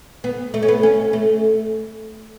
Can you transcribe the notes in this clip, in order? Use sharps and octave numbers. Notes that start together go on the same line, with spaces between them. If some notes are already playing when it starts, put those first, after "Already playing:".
B3
A3
C#4
B3
C#4
A3